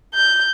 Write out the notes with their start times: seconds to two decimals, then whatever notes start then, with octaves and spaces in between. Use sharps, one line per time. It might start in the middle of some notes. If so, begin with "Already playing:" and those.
0.15 G6